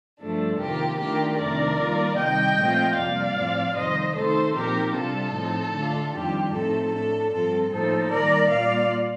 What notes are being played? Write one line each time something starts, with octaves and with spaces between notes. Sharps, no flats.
G2 F3 A3 D4 A4
F2 C3 D#3 A#3 F4 G4 A#4
D#3 A3 D4 F4 G4 A#4
F2 C3 D#3 A3 D4 A#4 D5
D#3 G3 A#3 F4
C3 D#3 G3 D#5 G5
A#2 F3 A3 C4 F4
F2 C3 G3 A#3 D5 F5
A2 F3 C4
F2 C3 D#3 G3 C5 D#5
D#3 A3 D#4 A4 C5
A#2 F3 C4 D#4 G4 A#4
C3 G3 D4 F4 A4
A2 F3 C4 D#4
D3 A3 D4 F4
F2 D#3 G3 D4 F4 G4
A2 F3 A3 C4 D#4 A4
A2 A3 D4 A4
G2 F3 C4 F4 A4
A2 F3 A#3 D#4 A4 C5
D#3 G3 A#3 A#4 D5
A#2 G3 A#3 F4 D5 F5